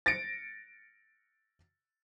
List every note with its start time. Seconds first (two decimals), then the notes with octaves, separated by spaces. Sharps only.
0.06 A6 A#6 C#7 D7